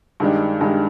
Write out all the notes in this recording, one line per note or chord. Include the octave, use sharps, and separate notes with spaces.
G2 D#3 G#3 D4
G2 D#3 G#3 D4